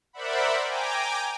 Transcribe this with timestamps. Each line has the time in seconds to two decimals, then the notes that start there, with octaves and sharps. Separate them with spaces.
0.13 A#4 C5 D5 E5 F#5 B5
0.65 G5 G#5 A#5 D6